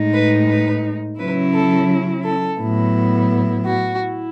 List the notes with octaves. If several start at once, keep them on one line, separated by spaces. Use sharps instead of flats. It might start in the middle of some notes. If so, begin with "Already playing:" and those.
Already playing: A2 G#3 D#4
B4
B4
C#3 F#3 C#4 E4 B4
A4
A4
A2 F#3 B3 E4
F#4
E4